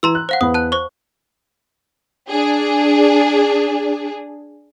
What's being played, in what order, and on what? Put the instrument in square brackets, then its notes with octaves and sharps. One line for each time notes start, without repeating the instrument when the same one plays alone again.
[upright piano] E3 [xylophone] A#5 C6 E6
[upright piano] F#6
[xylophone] C5 F5 F#5
[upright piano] E2 B3 B5 [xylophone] D#6
[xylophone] A5 F#6
C5 C#6
[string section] D4 G#4